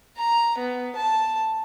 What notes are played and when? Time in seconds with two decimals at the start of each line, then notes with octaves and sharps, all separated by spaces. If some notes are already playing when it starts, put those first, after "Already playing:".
0.17 A#5
0.58 B3
0.95 A5